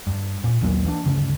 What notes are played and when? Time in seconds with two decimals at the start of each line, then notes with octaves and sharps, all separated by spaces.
0.07 G2
0.44 A#2
0.61 A#1 D#2 F#3 A#3
0.85 E3 A#3 D4
1.05 D2 G2 C#3